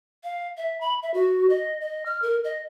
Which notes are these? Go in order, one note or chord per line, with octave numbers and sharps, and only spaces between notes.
F5
E5
B5
E5
F#4
D#5
D#5
F6
A#4
D#5